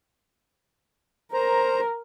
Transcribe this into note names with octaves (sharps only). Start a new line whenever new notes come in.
A#4 C5 A#5